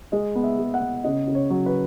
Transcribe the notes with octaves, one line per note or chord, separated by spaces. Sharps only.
G#3 D#5
B3
E5
G#3
F#5
B3
C#3 D#5
C#3
C#5
F#3
B4